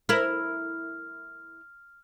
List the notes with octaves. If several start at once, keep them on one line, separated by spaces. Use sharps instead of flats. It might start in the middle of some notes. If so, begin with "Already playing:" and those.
E4 A#4 F6